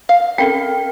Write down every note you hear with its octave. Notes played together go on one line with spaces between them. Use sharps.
F5
C4 C#4 A4 A#4 G5